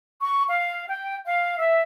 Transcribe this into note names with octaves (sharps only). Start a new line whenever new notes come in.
C#6
F5
G5
F5
E5